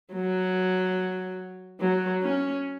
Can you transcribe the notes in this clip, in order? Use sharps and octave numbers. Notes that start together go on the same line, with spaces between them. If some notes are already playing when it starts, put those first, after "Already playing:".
F#3
F#3
C#4